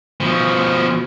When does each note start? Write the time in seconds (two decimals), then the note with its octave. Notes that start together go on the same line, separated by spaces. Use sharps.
0.21 B2 F3